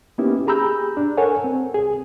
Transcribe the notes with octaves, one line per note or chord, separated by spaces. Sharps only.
A#3 B3 C#4 D#4 E4 G4
G4 G#4 A#5 B5 E6 G6
D4
A4 A#4 C#5 F#5 G#5
C4
C2 G#4